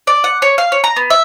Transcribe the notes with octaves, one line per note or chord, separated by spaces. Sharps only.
D5
F#5
C#5
F5
C#5
A#5
B3
E5